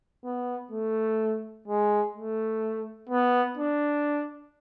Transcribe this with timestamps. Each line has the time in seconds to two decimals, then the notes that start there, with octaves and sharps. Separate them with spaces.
0.25 B3
0.72 A3
1.68 G#3
2.15 A3
3.10 B3
3.58 D4